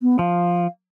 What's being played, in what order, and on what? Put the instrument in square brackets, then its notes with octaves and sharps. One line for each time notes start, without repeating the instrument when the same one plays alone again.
[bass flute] B3
[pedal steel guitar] F3 [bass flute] F5